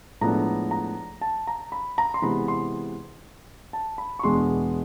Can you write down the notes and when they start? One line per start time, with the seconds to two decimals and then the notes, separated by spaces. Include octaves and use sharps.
0.21 A2 F3 G#3 B3 D4 A#5
0.71 A#5
1.21 A5
1.47 A#5
1.72 B5
1.98 A#5
2.14 C6
2.22 C3 E3 G#3 B3 B5
2.48 C6
3.73 A5
3.98 B5
4.19 C#6
4.23 E2 B2 G#3 B3 D4 C6